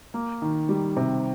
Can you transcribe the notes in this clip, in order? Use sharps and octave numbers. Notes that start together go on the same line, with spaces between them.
A#3
D#3
G3
C3